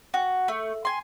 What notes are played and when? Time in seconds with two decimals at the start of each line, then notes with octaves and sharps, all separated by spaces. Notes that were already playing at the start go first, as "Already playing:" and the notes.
0.14 F#4
0.48 A3
0.85 G#5 C6